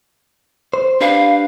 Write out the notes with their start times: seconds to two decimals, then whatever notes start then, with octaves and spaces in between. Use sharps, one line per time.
0.74 C5
1.01 D4 G4 B4 F5